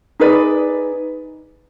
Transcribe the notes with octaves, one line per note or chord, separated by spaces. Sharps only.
D#4 G#4 B4 D5